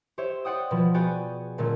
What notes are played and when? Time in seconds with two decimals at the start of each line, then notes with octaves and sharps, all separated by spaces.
0.18 G4 C5 C#5 E5
0.45 C5 D5 F#5 G5 D#6
0.71 B2 F3
0.94 B3 F#4 G#4 D5 G5 G#5
1.58 A#2 D3 A3 A#3 C#4